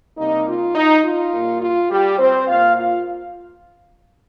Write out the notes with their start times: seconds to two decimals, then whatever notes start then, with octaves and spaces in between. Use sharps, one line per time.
0.17 C3 G3 A#3 D#4
0.47 F4
0.75 D#4
1.04 F4
1.33 A#2 G3 A#3
1.61 F4
1.90 G3 G4
2.18 C4 C5
2.47 A#2 A#3 F4 F5
2.76 F4 F5